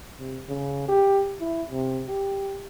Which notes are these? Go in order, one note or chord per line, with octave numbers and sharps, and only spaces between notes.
C3
C#3
G4
E4
C3
G4